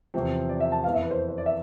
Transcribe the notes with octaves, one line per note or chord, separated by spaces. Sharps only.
E2 C3 F3 C4
D5
E5
A5
F2 E3 B3 F5
E5
B4
C5
C5
D5
E5